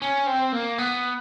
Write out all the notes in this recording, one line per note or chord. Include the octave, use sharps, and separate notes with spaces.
C#4
C4
A#3
B3